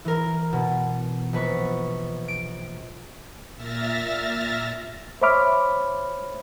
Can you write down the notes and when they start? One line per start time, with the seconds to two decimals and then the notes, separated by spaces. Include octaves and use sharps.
0.05 E3 A#4
0.53 B2
1.33 A#1 B4 C#6
2.28 D7
3.56 A#2 E5 F6 A6 A#6
5.22 C5 C#5 E5 B5 D6 F6